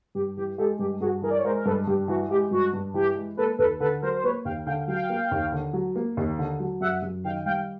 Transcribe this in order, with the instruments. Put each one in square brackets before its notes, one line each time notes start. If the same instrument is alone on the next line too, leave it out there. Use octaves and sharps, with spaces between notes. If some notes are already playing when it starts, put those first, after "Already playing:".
[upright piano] G2 [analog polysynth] G4
[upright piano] E3 [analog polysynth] G4
[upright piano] G#3 [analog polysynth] G4 A4
[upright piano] G2 [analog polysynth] G4
[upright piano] G2 [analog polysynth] F#4 G#4
[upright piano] E3 [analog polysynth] G#4 A#4
[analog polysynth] D5
C#5
[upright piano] G#3 [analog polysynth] A#4 C5
[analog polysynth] A#4
[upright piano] G2 [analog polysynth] A4 B4
[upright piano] G2 [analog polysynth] G4
[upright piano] E3 [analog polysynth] F#4
[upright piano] G#3 [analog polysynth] G4
[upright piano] G2 [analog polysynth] F#4
[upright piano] G2
[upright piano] E3 [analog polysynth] G4
[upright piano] G#3
[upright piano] A#3 [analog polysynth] A4 B4
[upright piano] D#2 [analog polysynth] A4 B4
[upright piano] D3 [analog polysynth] A4 B4
[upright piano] F#3 [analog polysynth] A#4 C5
[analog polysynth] C5
[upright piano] A#3 [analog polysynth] B4 C#5
[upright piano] D#2 [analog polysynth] F5 G5
[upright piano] D3 [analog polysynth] F5 G5
[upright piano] F#3 [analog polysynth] F5 G5
[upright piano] A#3
D#2
D3
F#3
A#3
D#2
D3
F#3
[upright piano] F#2 [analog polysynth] E5 F#5
[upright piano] F#2
[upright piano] D#3 [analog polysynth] F5 G5
[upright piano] G3 [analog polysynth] F5 G5